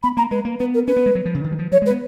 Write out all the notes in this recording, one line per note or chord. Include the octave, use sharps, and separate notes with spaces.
B3 B5
A#3 A#5
G#3 B4
A#3
B3 B4
A#4
C#4 B4
B3
G#3
F#3
F3
C#3
D#3
F#3
F3
F#3 C#5
G#3
B4
B3